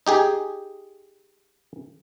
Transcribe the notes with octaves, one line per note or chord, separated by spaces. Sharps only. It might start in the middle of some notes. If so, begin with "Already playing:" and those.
D#4 G4 G#4